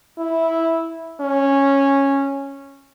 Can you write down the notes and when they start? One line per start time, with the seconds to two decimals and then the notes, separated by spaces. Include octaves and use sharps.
0.18 E4
1.21 C#4